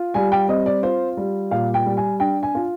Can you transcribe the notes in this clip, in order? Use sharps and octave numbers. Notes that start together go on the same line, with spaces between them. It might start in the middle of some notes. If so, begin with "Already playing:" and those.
Already playing: F4
G3 G#5
G5
C4 D#5
D5
F4 C5
G3
A#2 F5
G5
G3
G#5
D4 G5
G#5
F4